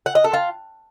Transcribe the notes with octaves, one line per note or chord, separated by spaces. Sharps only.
F#5
D#5
A4
F4